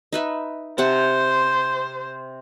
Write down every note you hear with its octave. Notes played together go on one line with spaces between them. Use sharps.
D#4 B4 E5
C3 C5 F#5 A5